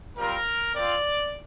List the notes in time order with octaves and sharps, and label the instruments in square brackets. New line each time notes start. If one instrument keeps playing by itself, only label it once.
[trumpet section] G3 C4 F4 A#4
C4 F4 D5